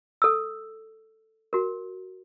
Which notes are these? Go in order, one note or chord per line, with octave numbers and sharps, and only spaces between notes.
A4 E6
F#4 A#4